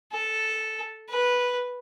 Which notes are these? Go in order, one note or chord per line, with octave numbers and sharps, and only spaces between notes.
A4
B4